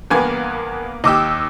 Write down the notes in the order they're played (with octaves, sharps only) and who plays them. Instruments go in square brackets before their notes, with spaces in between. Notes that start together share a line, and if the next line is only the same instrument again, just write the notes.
[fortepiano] E2 G2 G#5 [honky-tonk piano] A#3 B3
[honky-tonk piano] D#2 D6 E6 [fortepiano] G4 D#5